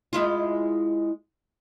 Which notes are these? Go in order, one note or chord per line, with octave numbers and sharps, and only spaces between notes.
G#3 E4 F4